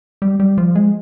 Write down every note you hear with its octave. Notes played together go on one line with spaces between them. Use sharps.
G3
G3
F3
G#3